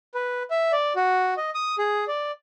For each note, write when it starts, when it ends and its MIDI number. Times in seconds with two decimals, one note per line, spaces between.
0.14 0.43 71
0.51 0.72 76
0.72 0.93 74
0.96 1.34 66
1.37 1.50 75
1.55 1.76 87
1.78 2.05 68
2.08 2.31 74